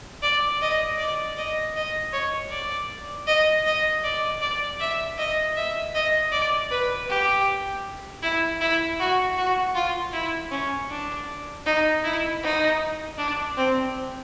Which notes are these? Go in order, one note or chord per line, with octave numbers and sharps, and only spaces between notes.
D5
D#5
D5
D#5
D#5
C#5
D5
D#5
D#5
D5
D5
E5
D#5
E5
D#5
D5
B4
G4
E4
E4
F#4
F#4
F4
E4
C#4
D4
D#4
E4
D#4
D4
C4